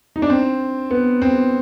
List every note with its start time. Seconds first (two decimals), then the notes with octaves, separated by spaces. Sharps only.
0.16 D#4
0.22 D4
0.30 C4
0.91 B3
1.22 C4